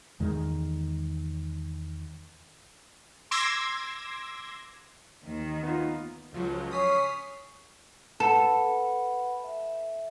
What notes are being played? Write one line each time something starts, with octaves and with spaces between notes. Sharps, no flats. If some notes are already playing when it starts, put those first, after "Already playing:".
E2 D#3 G#3
C6 D6 E6 G#6 A#6
D#2 D#3
B3 D#4 F4
C#2 F3 F#3
C#4 D#6 B6 C7
A4 B4 F#5 B5
E5